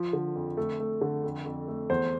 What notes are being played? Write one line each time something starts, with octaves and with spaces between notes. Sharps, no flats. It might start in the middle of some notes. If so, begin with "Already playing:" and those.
Already playing: F3 F4
D3
F2
A3
A3
D3
F2
F2
A3
E2 C5